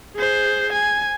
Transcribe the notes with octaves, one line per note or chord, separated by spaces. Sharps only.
G#4 C5
G#5